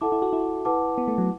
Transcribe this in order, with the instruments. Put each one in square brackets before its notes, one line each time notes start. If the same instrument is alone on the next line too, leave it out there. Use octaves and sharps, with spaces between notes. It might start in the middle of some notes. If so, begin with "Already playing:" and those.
[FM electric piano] E4 [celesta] A4 F#5 A5 D6
[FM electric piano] E4
F#4
E4
[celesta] E4 B4 F#5 A5 D6
[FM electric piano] B3
A3
F#3